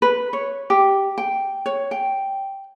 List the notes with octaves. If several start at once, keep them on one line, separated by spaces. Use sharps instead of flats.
B4
C#5
G4
G5
C#5
G5